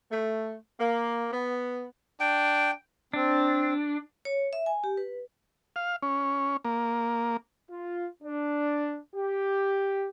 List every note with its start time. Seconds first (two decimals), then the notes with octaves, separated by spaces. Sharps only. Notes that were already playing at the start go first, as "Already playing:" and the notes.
0.12 A3
0.80 A#3
1.32 B3
2.20 D4 G5
3.14 C4 D4
4.25 C#5
4.53 E5
4.66 G#5
4.84 G4
4.97 B4
5.76 F5
6.03 C#4
6.65 A#3
7.71 F4
8.23 D4
9.15 G4